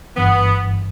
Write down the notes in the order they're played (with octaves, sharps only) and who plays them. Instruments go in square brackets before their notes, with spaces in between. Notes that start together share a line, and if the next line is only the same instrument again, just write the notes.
[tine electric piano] G1 G2 E3 [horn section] B3